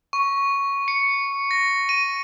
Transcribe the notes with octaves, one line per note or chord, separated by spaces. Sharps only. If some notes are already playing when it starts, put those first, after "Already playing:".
C#6
C#7
A#6
D#7